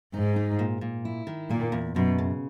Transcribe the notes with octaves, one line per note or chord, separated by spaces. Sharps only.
G#2 D#4
D#4
A#2
A#2
E4
D#3
A#2 A#3
E2
F#2 B2
C#3